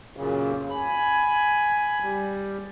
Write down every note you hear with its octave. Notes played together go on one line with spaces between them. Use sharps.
F#2 A#2 C#3
G#5 B5
G3